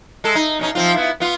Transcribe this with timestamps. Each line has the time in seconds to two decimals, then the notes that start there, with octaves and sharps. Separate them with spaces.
0.24 G#3 A4
0.35 D#4
0.59 B2 C#4 D#4
0.75 F3 C4 F4
0.94 B3 E4
1.20 B3 F4